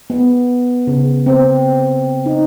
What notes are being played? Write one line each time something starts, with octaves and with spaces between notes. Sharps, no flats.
B3
C#3
C4
D#4